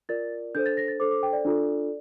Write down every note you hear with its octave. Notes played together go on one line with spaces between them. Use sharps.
F4 A#4 D5 A6
D4 A4 C5 G6
A6
A#6
A6
D4 A4 C5 D6
D6
G5
D5
D4 F4 A4